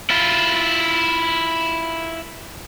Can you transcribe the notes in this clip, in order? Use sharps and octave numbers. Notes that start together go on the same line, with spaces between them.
E4 F4